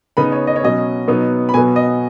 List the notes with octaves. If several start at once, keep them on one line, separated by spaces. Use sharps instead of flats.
C#3 B3 D#4 B5
C#5
D#5
C#5
B2 F#3 C#4 D#5
B2 F#3 B3 D#4
B5
B2 F#3 B3 G#5
D#5